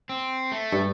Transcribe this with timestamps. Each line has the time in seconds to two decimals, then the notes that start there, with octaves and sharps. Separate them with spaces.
0.09 C4
0.52 A3
0.72 G2